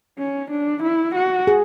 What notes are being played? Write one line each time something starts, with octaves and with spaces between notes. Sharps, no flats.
C#4
D4
E4
F#4
G#4